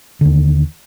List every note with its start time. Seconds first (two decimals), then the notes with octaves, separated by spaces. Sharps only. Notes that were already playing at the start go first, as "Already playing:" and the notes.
0.21 D#2 D3